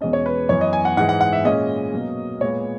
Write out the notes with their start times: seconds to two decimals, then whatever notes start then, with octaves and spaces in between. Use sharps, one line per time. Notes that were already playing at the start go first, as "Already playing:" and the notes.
0.01 E2 B2 G#3 C#4 D#5
0.13 C#5
0.26 B4
0.49 F#2 E3 B3 C#5
0.61 D#5
0.73 G#5
0.85 F#5
0.97 G#2 E3 G#3 F#5
1.09 F#5
1.21 F#5
1.33 E5
1.44 A#2 G#3 C#4 D#5
1.93 B2 F#3 A#3
2.41 A#2 G#3 B3 C#5